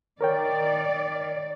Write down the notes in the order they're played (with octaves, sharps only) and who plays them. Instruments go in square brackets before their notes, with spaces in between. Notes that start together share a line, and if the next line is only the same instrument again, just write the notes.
[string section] D#3 [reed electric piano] A#4 C#5 G5 [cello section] D5